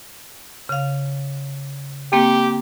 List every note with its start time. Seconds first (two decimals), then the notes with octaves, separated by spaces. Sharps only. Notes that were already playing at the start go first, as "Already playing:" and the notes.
0.69 C#3 F5
2.13 A#3 C4 G4